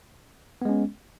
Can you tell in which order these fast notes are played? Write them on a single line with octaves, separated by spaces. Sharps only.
B3 G#3 C#4